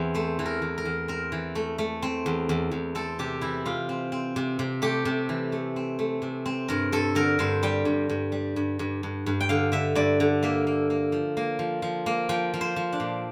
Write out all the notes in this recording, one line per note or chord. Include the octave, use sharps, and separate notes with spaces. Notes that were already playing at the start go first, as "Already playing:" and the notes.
Already playing: E2 E3 C4
A3 C5
E3
A#4
E3
A#4
E2
C4 A#4
E3
A3
A3
C4
E2
E2
E2
C4 A4
C3 G4
E3 E4
C3 F4
C4
C4
C3
C3
A3 G4
C3
E3
A3
C4
A3
C3
C4
G2 A#4
G2 A4
D3 A#4
G2 C5
G3 G5
G2
G2
G3
G2
G2
G2
G2
G5
D3 F5
D3 E5
G2 D5
D3
A#3 E5
A#3
A#3
F3
A#3
F3
F3
A#3
F3 G5
F3
C5
F3
D4
A#2